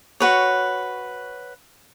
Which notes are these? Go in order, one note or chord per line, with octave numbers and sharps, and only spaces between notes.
F#4 B4 C#5